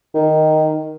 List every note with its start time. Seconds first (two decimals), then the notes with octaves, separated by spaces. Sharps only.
0.15 D#3